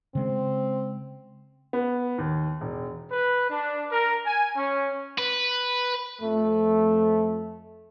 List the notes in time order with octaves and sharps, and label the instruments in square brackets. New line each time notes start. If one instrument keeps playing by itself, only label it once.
[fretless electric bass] C#3 G#3 [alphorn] C4
[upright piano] B3
D#2
E1
[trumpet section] B4
D4
A#4
G#5
C#4
[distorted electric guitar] B4
[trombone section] F2 A3